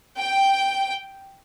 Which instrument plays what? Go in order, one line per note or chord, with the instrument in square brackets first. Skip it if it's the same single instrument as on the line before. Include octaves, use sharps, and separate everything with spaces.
[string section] G5